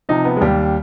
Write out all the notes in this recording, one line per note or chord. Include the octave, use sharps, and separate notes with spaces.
C3 F3 D#4
B3
G#3
D#2 G3